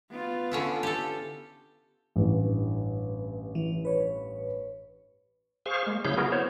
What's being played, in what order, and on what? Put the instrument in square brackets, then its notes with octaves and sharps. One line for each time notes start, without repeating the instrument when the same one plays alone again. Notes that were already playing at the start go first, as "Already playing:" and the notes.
[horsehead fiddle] B3 F4
[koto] D3 C#4 E4
G4 A4
[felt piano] A1 G2
[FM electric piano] E3
B4 C#5
[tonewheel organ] G#4 C5 F5 C#6
G#3 A#3
C#3 F#3 E4 G#4 F5 G6
B3 E4 F#4 G#4 A#4
B3 C5 C#5